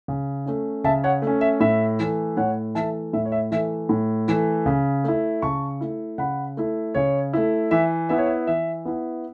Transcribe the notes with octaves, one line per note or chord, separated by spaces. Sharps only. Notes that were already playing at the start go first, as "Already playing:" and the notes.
C#3
A3 C#4
C#3 E5 A5
C#5 F#5
A3 C#4
E5
A2 E5
E3 A3
A2 C#5 F#5
E3 A3 E5 A5
A2 E5
C#5
E5
E3 A3 E5
A2
E3 A3
C#3
A3 E4
C#3 A5 C#6
A3 E4
C#3 F#5 B5
A3 E4
C#3 C#5
A3 E4
E3 E5
B3 E4 E5
C#5
E5
E3 E5
B3 E4